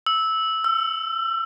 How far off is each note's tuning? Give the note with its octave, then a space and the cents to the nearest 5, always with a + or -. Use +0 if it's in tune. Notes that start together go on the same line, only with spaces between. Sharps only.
E6 -10
E6 +30